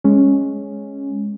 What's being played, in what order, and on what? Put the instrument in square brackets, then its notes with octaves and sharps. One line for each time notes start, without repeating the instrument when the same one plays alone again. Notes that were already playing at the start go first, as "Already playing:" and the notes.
[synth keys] G#3 C#4